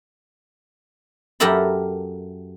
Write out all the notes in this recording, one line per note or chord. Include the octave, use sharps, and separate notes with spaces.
F#2 G4 A4 A#4 E5 B5